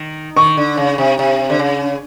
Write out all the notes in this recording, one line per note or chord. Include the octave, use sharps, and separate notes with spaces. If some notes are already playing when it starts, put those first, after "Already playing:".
Already playing: D#3
D#3 C#6
D3
C#3
C3
C3
D3
C#3